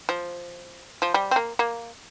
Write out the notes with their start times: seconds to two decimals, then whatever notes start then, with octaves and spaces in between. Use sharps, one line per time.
0.09 F3
1.02 F3
1.14 G3
1.31 C4
1.36 A#3
1.59 A#3